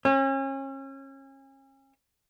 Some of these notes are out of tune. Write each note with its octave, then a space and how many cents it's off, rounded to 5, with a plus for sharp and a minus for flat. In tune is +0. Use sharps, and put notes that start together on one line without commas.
C#4 -35